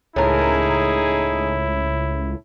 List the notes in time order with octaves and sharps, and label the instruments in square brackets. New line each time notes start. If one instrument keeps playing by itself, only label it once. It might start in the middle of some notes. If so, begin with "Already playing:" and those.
[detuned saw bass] C#2 [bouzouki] A2 A#4 [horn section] D#4 G#4 [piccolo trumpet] E4